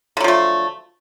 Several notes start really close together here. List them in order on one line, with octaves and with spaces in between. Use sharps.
D3 F#3 F3 A3